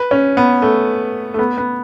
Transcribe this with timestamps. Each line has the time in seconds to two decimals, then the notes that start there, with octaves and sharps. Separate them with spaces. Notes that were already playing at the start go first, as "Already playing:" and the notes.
Already playing: B4
0.11 C#4
0.37 B3
0.62 A3
1.34 A3
1.39 B3
1.58 B3